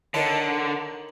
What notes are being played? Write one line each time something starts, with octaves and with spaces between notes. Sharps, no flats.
D3 D#3 C#5